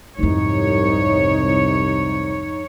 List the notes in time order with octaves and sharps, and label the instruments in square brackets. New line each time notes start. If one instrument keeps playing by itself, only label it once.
[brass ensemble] C2 [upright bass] F2 G#2 [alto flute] D#4 [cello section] C#5